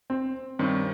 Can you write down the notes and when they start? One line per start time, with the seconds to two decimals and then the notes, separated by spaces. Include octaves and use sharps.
0.10 C4
0.59 G2 D#3 G3 C4 C#4